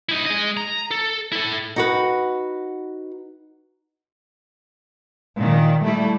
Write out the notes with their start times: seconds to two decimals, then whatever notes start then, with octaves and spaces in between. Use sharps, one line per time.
0.09 D#4 E4
0.27 G#3 D#5
0.57 A#5
0.91 A4
1.32 E4 A4
1.76 D#4 F#4 B4
5.37 A#2 D#3
5.84 G3 A3 E4